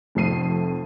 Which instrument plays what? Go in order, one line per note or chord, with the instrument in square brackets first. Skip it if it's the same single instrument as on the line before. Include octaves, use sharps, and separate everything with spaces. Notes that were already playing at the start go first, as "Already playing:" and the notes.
[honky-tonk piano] F1 F2 A3 C7 D#7